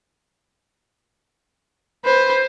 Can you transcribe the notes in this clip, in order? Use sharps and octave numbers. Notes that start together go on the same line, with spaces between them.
B4 C5